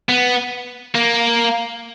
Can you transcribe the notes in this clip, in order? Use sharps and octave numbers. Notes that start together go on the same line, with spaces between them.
B3
A#3